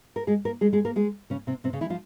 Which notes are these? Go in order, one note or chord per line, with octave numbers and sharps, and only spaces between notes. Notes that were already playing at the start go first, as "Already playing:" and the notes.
A#4
G#3 G#4
A#3 A#4
G#3 G#4
G#3 G#4
A#3 A#4
G#3 G#4
C#3 C#4
C3 C4
C3 C4
C#3 C#4
E3 E4
F3 F4